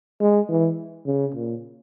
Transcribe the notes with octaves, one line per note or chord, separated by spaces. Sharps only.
G#3
E3
C#3
A#2